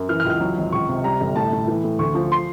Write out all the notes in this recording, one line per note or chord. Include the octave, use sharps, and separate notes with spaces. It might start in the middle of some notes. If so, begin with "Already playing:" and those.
Already playing: F#2
E3 F6
F6
C#2
F6
F#3
G#1
C#2 C#6
C3
G3 A#5
G1
A2 A5
A2
E3
A2
D2 C#6
F3
C6